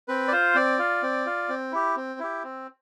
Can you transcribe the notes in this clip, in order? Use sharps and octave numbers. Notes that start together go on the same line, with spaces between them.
C4 B4
D5
F4 C5
C4 D5
F4
C4
F4
C4
E4 G4
C4
E4 G4
C4